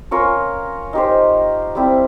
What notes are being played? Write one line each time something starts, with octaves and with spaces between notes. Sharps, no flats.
C#4 F4 A#4 C#5
D#4 G4 C5
G3 C4 E4